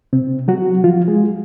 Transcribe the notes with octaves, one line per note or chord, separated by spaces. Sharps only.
C3 C4
F#3 F#4
F3 F4
G#3 G#4